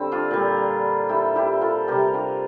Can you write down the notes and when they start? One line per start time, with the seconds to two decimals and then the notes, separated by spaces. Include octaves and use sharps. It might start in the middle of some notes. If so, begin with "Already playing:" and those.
Already playing: D3 G3 C4
0.12 D4 F4
0.31 A#2 G3
1.09 E4 G4
1.35 E4 G4
1.61 F4 A4
1.88 C3 G3 G4 A#4
2.13 D4 F4